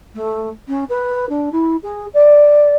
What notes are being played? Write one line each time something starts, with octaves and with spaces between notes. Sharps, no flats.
A3
C#4
B4
D4
E4
G#4
D5